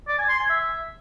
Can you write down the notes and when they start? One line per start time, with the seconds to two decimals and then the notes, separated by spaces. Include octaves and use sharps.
0.08 D5
0.18 G#5
0.29 C6
0.39 G#5
0.50 E5